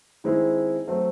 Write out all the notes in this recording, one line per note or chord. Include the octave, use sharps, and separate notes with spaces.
D#3 G#3 C4 E4
F#3 A3 C4